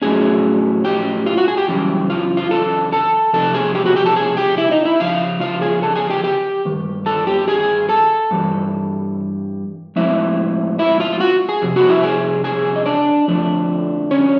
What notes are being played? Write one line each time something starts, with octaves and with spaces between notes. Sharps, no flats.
A2 F#3 A3 C#4 G#4 G#5
G4 G5
F4 F5
F#4 F#5
G#4 G#5
G4 G5
F#2 C#3 E3 G3
F4 F5
F4 F5
A4 A5
A4 A5
C3 F3 A3 A4 A5
G#4 G#5
G4 G5
F#4 F#5
G4 G5
A4 A5
G#4 G#5
G4 G5
E4 E5
D#4 D#5
E4 E5
C#3 F3 F5
F4 F5
G#4 G#5
A4 A5
G#4 G#5
G4 G5
G4 G5
G2 D#3
A4 A5
G4 G5
G#4 G#5
A4 A5
G2 E3 G3
A2 F3 G#3 C4 E4 E5
E4 E5
F4 F5
F#4 F#5
G#4 G#5
F2 C3
F#4 F#5
E4 E5
G#4 G#5
G#4 G#5
D#5
D4 D5
F2 D3 F3 A3 D4
C#4 C#5